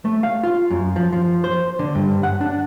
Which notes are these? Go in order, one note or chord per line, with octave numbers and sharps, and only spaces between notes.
A3
F5
F4
F#2
F3
F3
C5
D3
G2
F#5
D4